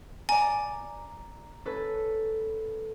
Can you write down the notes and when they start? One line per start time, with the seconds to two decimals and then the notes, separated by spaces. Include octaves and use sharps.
0.29 D5 G#5 A#5
1.65 C#4 A4 B4